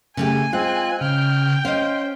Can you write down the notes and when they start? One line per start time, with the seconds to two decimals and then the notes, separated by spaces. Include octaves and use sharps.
0.17 C#3 A3 G4 G#5
0.53 G#3 C4 F4 F#6
1.01 C#3 G5 F6
1.65 C#4 C5 D#5 F5